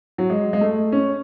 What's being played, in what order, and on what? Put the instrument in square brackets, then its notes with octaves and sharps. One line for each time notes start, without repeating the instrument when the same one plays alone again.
[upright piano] F#3
G#3
G#3
A3
C#4